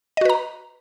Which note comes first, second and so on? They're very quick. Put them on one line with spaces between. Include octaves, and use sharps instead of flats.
D#5 F#4 B4 A#5